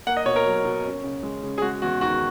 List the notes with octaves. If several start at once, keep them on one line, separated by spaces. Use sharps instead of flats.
A#3 F#5
D#5
B2 C#5
A#4
F#3
B2
C#4
C#3
G#3
C#3
G#4
G#3 F#4
E2 F#4
D#3 F#4